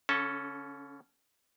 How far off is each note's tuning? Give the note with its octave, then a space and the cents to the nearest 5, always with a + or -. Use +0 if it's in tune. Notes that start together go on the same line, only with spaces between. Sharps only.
D3 -45 C#4 +0 A4 +0